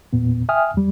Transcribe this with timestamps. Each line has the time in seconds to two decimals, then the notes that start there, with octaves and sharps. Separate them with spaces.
0.13 E2 A#2 B3
0.49 E5 G5 G#5 D#6 F6
0.74 E2 G3